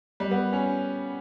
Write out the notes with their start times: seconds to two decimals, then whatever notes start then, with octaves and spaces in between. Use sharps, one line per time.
0.20 G3
0.31 B3
0.53 C#4